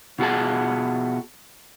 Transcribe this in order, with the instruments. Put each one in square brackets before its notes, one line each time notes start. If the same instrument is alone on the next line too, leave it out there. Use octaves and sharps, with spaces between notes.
[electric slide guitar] B2 F4 F#4 G#4 A5